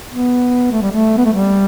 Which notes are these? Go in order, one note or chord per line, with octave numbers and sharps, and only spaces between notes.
B3
A3
G3
A3
B3
A3
G3